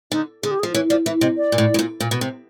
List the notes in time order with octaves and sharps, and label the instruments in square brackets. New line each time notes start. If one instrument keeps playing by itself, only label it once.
[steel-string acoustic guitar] D3 [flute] D#4
[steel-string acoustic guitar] D3 [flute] G#4
[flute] G4
G#4
[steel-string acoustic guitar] F3
[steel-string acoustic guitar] E3 [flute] C#5
[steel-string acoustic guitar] F3 [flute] D5
[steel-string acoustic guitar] E3 [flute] E5
[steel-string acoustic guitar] C3 [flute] D#5
[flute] D5
[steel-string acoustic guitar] A#2
A2
A2
A#2
A#2
B2
C3